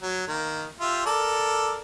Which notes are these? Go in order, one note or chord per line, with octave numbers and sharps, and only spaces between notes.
F#3
D#3 A#3 A#4
F4 G4 E5
A4 A#4 D5